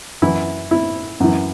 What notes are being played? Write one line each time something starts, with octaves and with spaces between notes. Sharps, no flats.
F#2 E3 E4
E4
F#2 E3